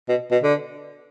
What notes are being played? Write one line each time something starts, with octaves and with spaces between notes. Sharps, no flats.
B2
B2
D3